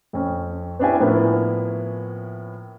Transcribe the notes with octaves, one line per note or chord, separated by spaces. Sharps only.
F2 C4 C#4
B3 C#4 D4 E4 G4 G#5
A2 F3 A#3 B3 C#4 E4